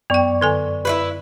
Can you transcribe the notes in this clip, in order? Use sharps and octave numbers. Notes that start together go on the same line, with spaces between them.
F#2 B3 D5 G5 C#6
D3 A4 G#5
E4 F4 B4